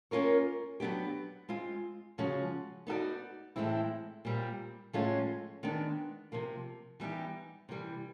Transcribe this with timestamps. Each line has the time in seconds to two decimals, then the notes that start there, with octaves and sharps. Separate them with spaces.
0.11 A#3 C#4 F4 A#4 C#5
0.80 F#3 B3 D4 G4
1.49 G#3 C4 F4
2.18 C#3 F3 G#3 C#4 F#4
2.87 B3 D#4 F#4 A4 D5
3.56 A2 E3 G#3 C4 E4
4.25 A#2 G3 C4
4.93 A2 F3 G#3 C#4 F4
5.63 D#3 G#3 B3 D4
6.32 C3 F3 A#3
7.00 E3 G3 B3 D#4 G4
7.69 C3 E3 G3